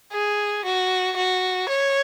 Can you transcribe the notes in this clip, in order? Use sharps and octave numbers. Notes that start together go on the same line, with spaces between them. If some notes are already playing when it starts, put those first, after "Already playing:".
G#4
F#4
F#4
C#5